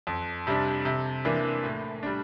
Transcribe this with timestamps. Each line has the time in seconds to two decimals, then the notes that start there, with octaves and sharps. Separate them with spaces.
0.07 F2
0.47 C3 G3 D4
0.85 C3
1.25 E3 A#3 D4
1.64 A2
2.03 G3 D4